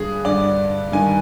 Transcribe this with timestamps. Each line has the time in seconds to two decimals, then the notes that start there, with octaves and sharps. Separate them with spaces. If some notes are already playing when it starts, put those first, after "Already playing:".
Already playing: G2 D3 G#4
0.25 G2 D3 D5
0.92 G2 D#3 G#5